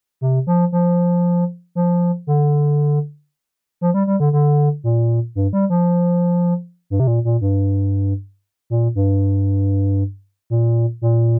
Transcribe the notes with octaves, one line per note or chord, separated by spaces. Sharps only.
C3
F3
F3
F3
D3
F3
G3
G3
D3
D3
A#2
G2
G3
F3
G2
C3
A#2
A#2
G2
A#2
G2
A#2
A#2